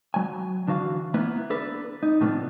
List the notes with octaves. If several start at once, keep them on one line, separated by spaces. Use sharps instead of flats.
F#3 G#5
D3 E3 F#4 F5
A#3 B3 E4
D4 A4 B4
D#4
A2 C3 F3 A3 B3 D4